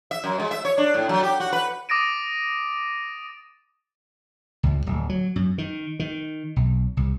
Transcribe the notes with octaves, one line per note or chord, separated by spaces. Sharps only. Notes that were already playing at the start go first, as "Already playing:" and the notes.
E5
F#2
G#3
E5
C#5
D4
A2
F#3
G4
F#4
B4
D6 D#6 A6 A#6 D7 D#7
C#2
D1
F#3
F#2
D#3
D#3
B1
C2